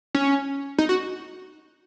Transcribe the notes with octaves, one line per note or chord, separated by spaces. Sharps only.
C#4
D#4
F#4